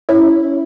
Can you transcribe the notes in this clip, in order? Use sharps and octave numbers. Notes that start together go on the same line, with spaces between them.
C#4 E4